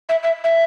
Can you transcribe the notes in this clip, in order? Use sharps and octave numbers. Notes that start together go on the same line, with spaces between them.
E5
E5
E5